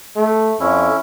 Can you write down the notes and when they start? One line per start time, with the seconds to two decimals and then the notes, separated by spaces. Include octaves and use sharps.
0.16 A3
0.60 F2 C#4 E4